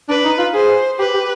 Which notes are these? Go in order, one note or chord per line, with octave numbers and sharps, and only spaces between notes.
D4 B4
D#4
F4
G#4 C5
G4 B4
G4